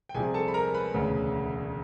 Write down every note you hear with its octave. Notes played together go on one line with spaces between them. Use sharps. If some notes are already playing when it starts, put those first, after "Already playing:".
G5
C2 C3 F3 G#4 G#5
A4 A5
B5
A#4 A#5
B4 B5
E1 D2 C#3